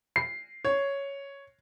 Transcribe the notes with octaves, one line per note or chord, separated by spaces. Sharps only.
C7
C#5